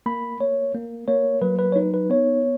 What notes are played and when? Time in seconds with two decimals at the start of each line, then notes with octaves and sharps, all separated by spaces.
0.06 A#3 B5
0.40 A#3 C#5
0.75 A#3
1.08 A#3 C#5
1.42 F#3 B4
1.59 B4
1.72 C#5
1.76 D#4 B4
1.94 B4
2.10 B3 C#5